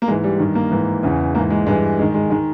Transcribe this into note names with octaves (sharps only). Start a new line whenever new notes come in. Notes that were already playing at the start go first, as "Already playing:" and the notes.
A#3
G#2 E3 G#3
G3
G2 D#3
A#3
G#2 E3
E2 C#3 E3
G#2 E3 A#3
G#3
G2 E3 G#3
G#2 D#3 G#3
G#3
D#3 G#3